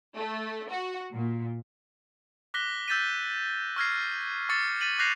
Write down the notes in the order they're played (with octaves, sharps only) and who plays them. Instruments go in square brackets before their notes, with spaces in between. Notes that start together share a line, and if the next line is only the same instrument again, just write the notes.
[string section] A3
F#4
A#2
[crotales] D6 F#6 A#6 B6 G7
E6 G6 A6 B6 D#7
C#6 E6 F6 G#6 A#6 C7
C#6 D6 E6 A6 C#7
A6 B6 D#7 F#7
D6 F#6 G6 A#6 C7 F7